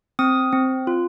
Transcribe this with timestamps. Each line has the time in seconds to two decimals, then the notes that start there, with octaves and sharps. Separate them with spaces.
0.19 C4 D#6
0.53 C4
0.87 F4